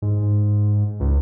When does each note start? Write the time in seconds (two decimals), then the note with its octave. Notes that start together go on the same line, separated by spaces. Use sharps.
0.02 G#2
1.00 C#2